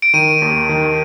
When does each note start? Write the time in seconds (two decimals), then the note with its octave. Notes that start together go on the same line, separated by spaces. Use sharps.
0.02 D7
0.14 D#3 D#7
0.42 D#2
0.69 D#3